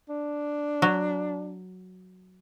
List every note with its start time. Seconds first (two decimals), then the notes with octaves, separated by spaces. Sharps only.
0.09 D4
0.82 F#3